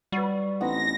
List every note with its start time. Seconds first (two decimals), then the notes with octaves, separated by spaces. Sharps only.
0.12 F#3 G3 B4
0.61 A1 B3 C4 D#4 A#6